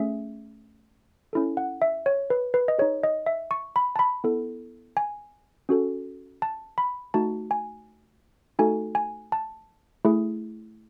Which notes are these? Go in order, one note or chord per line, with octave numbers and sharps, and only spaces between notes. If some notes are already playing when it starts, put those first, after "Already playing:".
Already playing: A3 C#4 G#4 E5
C#4 E4 A4
F#5
E5
C#5
B4
B4
D#5
D#4 G#4 C#5
D#5
E5
C#6
B5
A5
B5
B3 E4 A4
G#5
C#4 F#4 A4
A5
B5
A3 D#4 F#4 A5
G#5
A3 D#4 F#4 A4 G#5
G#5
A5
A3 E4 G#4